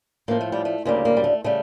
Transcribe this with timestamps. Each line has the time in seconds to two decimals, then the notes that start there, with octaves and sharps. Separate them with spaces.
0.28 A2 F3 A#3
0.41 A3
0.52 G3
0.65 A3
0.85 D2 C#3 G3 A#3
1.05 A#3
1.17 G3
1.24 A3
1.44 C#3 G3 A3